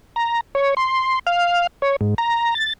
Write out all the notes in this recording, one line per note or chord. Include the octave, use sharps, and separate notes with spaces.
A#5
C#5
C6
F5
C#5
G#2
A#5
A6